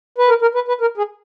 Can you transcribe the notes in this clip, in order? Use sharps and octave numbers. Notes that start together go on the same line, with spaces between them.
B4
A#4
A#4
B4
B4
A#4
G#4